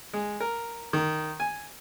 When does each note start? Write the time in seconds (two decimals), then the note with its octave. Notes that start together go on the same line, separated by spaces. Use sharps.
0.13 G#3
0.40 A#4
0.93 D#3
1.40 G#5